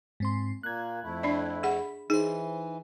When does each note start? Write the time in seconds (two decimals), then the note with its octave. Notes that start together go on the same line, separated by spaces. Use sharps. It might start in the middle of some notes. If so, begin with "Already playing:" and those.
0.20 G#2 C4 C6
0.63 A#2 A#3 F#6 G#6
1.03 F2 A3 E4
1.23 D4 D5
1.63 G#4 F#5 B5
2.10 E3 D#4 G#4 C5